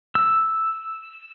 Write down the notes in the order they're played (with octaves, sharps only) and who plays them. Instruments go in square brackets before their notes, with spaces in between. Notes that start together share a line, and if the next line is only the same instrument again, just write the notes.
[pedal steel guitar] E6